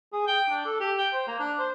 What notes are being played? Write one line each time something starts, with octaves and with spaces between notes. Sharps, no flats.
G#4
G5
D4
A4
G4
G5
C5
A#3
D4
C5